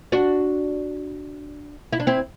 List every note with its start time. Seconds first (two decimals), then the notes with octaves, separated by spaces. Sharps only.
0.12 D4 F#4
1.93 E4
2.00 D4
2.07 C4 E4